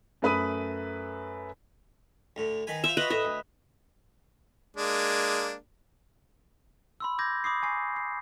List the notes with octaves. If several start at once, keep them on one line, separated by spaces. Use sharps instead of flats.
F#2 A3 B4 B5 D#6 D#7
D2 A2
D#3 B4 G#5
F4 C5 E5
F4 F#4 B4 D#5
A2 D#5 E5
D2
G#3 A#3 D4
B5 C6 E6
D6 G6 G#6 A#6
B5 D6 D#6 C7
G#5 C#6 C7
C7